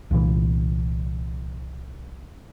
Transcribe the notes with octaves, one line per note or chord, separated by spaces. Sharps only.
C2 A#2 E3